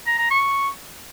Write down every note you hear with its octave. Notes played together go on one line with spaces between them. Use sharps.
A#5
A#5
C#6